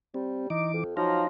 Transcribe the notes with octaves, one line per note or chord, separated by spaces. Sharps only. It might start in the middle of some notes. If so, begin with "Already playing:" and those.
G3 C4
E3 D#4 D6
F2
F3 F#3 D#4 F5 A#5